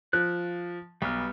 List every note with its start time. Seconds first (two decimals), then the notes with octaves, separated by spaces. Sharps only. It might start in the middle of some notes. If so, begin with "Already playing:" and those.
0.13 F3 F#6
1.02 B1 G3 B3 F6